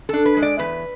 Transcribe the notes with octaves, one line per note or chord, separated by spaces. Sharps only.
D4 A4
B4
G#3
D5
E2 B4